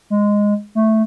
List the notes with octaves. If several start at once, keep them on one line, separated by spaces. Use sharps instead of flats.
G#3
A3